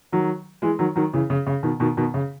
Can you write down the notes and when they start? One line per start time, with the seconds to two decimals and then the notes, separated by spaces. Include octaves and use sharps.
0.12 D#3 F#3
0.62 E3 G#3
0.79 D#3 F#3
0.96 D#3 F#3
1.13 C#3 E3
1.30 C#3
1.47 C#3
1.63 B2 D#3
1.80 B2 D#3
1.97 B2 D#3
2.14 C#3